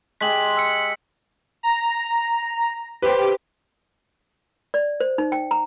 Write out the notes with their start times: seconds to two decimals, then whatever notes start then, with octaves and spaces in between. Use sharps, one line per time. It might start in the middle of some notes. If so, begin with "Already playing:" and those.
0.21 G#3 G4 B6 F#7
0.57 E6 C#7
1.63 A#5
3.02 G4 B4 C5
4.74 D5
5.00 C5
5.18 D#4
5.32 G5
5.51 A#5